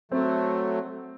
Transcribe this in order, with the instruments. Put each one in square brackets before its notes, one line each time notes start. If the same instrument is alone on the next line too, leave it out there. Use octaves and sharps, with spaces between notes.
[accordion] F#3 A3 [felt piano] C4